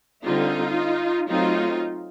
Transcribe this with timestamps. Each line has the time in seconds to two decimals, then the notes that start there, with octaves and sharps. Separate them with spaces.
0.24 D3 G3 C4 D#4 F4
1.29 F#3 A3 C4 D#4 F4